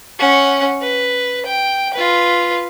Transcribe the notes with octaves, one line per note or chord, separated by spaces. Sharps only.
C#4 F#5
B4
G5
F4 B4